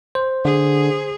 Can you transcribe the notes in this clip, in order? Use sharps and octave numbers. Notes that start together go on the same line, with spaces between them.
C5
D3 G#4